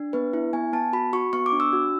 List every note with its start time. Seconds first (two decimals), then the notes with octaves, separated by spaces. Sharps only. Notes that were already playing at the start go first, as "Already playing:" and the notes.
Already playing: D4
0.13 B3 B4
0.33 E4
0.53 B3 G#5
0.73 B3 A5
0.93 F#4 B5
1.13 F#4 C#6
1.33 B3 C#6
1.46 D6
1.52 D4
1.60 E6
1.73 F#4